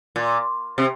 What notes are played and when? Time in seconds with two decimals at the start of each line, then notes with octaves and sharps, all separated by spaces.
0.16 A#2
0.78 C3